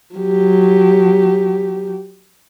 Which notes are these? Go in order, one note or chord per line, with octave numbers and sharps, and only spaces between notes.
F#3 G4